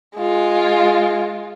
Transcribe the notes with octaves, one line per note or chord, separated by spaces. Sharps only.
G#3 F4